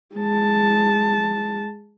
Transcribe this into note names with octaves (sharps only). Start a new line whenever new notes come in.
G#3 A5